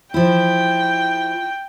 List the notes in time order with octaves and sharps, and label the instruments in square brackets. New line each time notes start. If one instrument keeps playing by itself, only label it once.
[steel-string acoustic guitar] F3 E4 [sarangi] G5